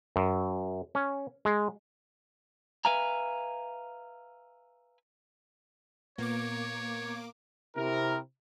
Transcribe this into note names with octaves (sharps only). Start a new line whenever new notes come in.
F#2
C#4
G#3
B4 E5 F5 G#5 A#5
A#2 A#3 B3 C#5 D6
C3 E4 A#4